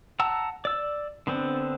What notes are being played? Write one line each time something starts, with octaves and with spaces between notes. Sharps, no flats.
F#5 A5 A#5 E6
D5 E6
D3 B3 C4 D4